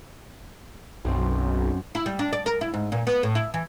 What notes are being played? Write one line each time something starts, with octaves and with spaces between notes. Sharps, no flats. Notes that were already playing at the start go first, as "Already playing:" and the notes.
B1 F#2 C4
E4
G3
D4
D5
A#4
E4
G#2
A#2
B3
A2
E4
E3